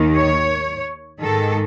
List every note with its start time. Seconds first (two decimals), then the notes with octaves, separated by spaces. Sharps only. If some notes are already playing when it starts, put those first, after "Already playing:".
Already playing: D#2 D#3
0.16 C#5
1.21 G#2 D#3 A4